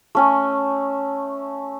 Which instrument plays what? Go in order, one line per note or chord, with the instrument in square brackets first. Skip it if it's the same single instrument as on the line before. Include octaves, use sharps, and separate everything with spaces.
[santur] A3 C#4 G#5